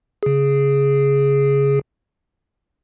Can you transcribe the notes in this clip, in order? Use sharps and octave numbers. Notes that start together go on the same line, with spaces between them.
C#3 G#4